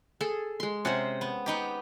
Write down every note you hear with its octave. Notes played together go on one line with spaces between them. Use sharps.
G#4 A4
G#3 C6
C3 C#4 G#4 C5 F#5
B3
B3 D#4 G4